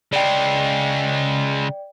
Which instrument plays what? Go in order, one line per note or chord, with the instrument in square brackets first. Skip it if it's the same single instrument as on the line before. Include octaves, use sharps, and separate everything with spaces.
[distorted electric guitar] C#3 G#3 [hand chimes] D5 G5